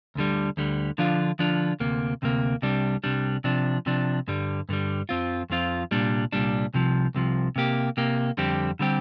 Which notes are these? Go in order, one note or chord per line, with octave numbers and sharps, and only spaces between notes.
D2 D3 G3
D2 D3 G3
D3 F3 D4 F4
D3 F3 D4 F4
D2 C3 A#3
D2 C3 A#3
C2 C3 G3 D4
C2 C3 G3 D4
C3 F3 D4
C3 F3 D4
G2 D3 G3
G2 D3 G3
F2 F3 C4 F4
F2 F3 C4 F4
C2 A#2 G3 D4
C2 A#2 G3 D4
C2 C3 F3
C2 C3 F3
C3 A#3 G4
C3 A#3 G4
F2 D3 G3 C4 G4
D3 G3 C4 G4